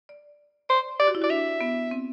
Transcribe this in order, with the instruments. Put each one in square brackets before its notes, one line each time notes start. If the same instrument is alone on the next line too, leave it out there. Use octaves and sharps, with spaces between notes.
[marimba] D5
[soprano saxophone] C5 [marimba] D5
[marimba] G4 [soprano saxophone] D5
[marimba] F#4
E4
[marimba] F#4 [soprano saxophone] D5
[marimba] D4 [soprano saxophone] E5
[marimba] B3
C4